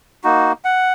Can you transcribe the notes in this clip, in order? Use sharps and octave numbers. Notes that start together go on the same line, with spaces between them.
A#3 D#4 F#4
F#5